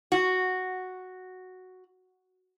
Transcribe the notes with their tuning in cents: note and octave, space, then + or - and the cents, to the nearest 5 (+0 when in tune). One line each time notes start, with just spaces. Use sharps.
F#4 +0